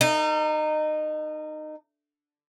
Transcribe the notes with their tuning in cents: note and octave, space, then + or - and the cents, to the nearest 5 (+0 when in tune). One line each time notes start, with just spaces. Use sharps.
D#4 -20 A4 +40